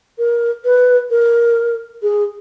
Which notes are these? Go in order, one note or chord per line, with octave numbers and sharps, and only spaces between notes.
A#4
B4
A#4
G#4